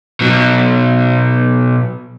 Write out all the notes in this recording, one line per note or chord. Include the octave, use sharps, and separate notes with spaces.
B2 F#3